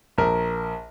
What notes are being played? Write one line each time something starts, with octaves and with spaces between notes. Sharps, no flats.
A#1 A#4